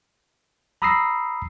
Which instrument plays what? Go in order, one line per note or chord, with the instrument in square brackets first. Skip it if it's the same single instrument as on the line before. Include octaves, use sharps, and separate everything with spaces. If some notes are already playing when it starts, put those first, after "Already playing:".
[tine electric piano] A#5 B5 D#6 E6 A#6 C7